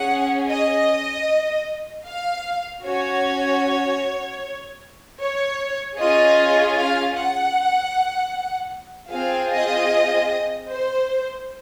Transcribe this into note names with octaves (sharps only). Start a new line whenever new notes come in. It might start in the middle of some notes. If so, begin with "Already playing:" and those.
Already playing: C#4 G#4 F#5
D#5
F5
C#4 F#4 C#5
C#5
C#4 F4 G#4 D#5
F5
F#5
C4 F4 G#4 F5
D#5
C5